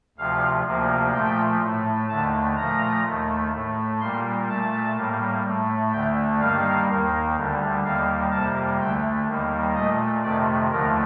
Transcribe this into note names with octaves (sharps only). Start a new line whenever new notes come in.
D2 C3 F3 F5
D2 C3 F3 A#3
A#2 F3 A3 G5
A2 A3
D#2 D3 A3 A5
A#2 F3 A3 A#5
D#2 D#3 A3
A2 A3
A#2 G3 A#3 C6
A#2 A3 A5
A2 G3 A#3
A2 A3
D2 D3 A3 G5
G2 D#3 G3 A#3 F5
D#2 D#3 A#3
D2 D3 G3
D#2 D#3 G3 A#3 F5
F2 C3 G3 A#3 A5
D2 D3 A3 G5
D#2 D#3 G3 A#3
A#2 A3 D#5
F2 C3 D#3 A3 D5
D#2 D3 F3 A3 A#4